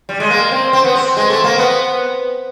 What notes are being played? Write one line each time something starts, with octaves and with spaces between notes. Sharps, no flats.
G3
G#3
A#3
C4
C4
B3
C4
G#3
A3
A#3
B3